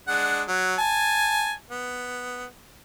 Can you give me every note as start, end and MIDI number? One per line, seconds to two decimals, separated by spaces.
0.08 0.43 56
0.08 0.43 62
0.08 0.43 78
0.48 0.75 54
0.78 1.53 80
0.78 1.53 81
1.71 2.45 59